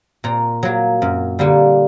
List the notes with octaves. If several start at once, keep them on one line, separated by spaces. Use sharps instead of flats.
A#2 A#5
F#3 A#3
F#2
D3 G3 A#3